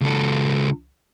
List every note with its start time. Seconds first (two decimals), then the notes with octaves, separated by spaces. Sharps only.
0.01 C#2 A4